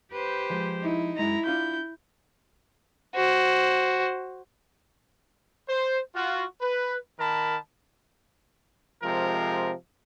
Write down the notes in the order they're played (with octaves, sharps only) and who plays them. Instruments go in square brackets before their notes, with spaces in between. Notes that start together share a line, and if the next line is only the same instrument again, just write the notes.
[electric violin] G4 C5 [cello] B4
[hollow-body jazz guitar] F3 G#3
[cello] D#4 E4
[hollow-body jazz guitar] F#2 G#3 D#5 [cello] E4 [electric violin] A#5
[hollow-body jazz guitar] D4 F4 B5 [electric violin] G6
[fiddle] F#4 C5
[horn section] C5
F4 F#4
B4
D#3 A#4 A5 B5
C3 F3 G#3 A#4